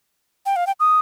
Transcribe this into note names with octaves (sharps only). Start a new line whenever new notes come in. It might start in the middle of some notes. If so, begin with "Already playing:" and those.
G5
F5
G5
D#6